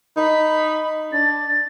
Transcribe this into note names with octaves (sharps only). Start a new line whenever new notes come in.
D#4 B5
D4 A6